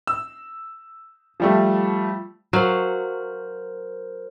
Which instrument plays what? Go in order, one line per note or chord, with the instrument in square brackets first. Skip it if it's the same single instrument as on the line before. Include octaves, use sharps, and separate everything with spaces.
[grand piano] E6
F3 G3 A3
[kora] F#3 F5 [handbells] A#4 C5